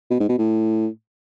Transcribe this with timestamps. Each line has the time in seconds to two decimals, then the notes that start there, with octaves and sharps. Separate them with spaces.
0.11 B2
0.20 G#2
0.29 B2
0.38 A2